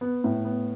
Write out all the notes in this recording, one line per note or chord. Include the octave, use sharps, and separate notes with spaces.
B3
A2
B3